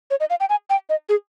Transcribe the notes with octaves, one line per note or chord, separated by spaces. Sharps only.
C#5
D#5
F5
G5
G#5
G5
D#5
G#4